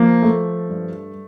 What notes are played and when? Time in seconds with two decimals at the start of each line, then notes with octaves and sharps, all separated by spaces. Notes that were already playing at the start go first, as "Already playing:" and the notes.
Already playing: F3 A#3
0.22 A3
0.69 G2